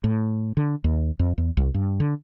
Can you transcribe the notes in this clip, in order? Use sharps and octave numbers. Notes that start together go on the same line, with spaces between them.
A2
D3
D#2
F2
E2
C2
G2
D3